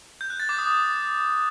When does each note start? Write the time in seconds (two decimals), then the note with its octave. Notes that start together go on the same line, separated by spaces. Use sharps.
0.21 G6
0.30 F#6
0.40 A6
0.49 D6
0.59 D#6